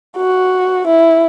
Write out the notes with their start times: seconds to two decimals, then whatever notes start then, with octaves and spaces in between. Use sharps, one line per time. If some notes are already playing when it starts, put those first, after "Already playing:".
0.17 F#4
0.87 E4